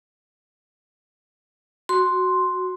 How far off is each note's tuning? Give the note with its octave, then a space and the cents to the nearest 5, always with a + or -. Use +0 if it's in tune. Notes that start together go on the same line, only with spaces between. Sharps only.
F#4 +0 C6 +0